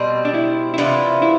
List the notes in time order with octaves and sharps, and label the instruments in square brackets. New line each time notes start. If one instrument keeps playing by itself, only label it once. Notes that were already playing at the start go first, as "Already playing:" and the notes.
Already playing: [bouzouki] B2 G3 C4
[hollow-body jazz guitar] D4
E4
E4
[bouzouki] C3 E3 B3 F4 [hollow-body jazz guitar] D4
[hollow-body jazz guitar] E4